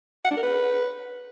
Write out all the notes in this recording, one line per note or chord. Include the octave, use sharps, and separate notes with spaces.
F#5
D4
A#4
B4